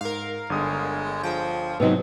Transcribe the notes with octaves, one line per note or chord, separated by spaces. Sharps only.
G#2 A#4 F5
G1 D3 G#3 D#6
F3 G5
G#2 C3 F#3 B3 C4 D#4